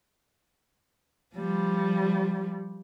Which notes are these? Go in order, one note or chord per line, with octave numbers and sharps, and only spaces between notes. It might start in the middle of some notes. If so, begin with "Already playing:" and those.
F3 G3